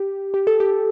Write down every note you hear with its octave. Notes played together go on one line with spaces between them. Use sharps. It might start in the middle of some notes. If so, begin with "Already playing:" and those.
Already playing: G4
G4
A4
G4